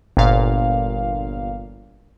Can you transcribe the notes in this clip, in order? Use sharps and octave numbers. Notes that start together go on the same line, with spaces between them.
G1 A#2 F5